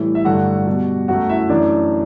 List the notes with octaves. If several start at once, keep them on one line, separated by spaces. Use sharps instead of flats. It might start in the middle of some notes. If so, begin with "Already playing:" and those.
Already playing: A2 E3 G3 E4
E5
G2 D3 F#3 A3 F#4 F#5
B2 G3
F#2 F#3 A3 F#4 F#5
E4 E5
F#2 E3 A3 D4 D5